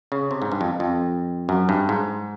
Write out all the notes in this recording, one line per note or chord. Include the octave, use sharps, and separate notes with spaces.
C#3
C3
G#2
G2
F2
F2
F#2
G2
G#2